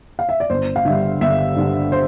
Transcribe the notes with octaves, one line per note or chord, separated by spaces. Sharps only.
F5
E5
D5
G1 C5
F5
G2 D3 E5
G1 E5
G2 D3
C5